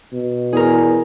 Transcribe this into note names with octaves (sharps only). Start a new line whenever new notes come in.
B2
E2 G#4 A#4